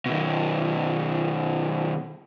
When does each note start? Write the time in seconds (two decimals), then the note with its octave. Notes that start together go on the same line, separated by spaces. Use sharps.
0.06 B2 D#3